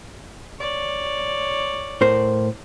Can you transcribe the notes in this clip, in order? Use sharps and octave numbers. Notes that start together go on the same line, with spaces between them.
C#5 D5
A2 A#4 C5